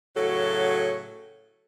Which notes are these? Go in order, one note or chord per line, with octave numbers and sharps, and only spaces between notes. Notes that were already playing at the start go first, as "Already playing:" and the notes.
A2 C#3 F#3 F#4 A4